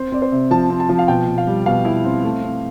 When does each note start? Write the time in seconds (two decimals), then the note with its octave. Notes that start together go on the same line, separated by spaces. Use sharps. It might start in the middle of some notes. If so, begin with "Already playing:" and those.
Already playing: C4 C5
0.12 C4 D5
0.22 C5
0.32 C3
0.51 F3 A5
0.70 C4
0.80 A5
0.89 F3
0.99 F5
1.08 B2 G5
1.28 B2
1.38 F5
1.47 G3
1.66 B2 F5
1.85 E4
2.05 C4
2.23 A3
2.43 C4